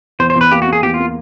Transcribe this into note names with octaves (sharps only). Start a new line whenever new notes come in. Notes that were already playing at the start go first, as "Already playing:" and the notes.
E2 C5
C5
E2
B4
A#3 G4
F#4
A#3
G#4
E2 G4
F4
A#3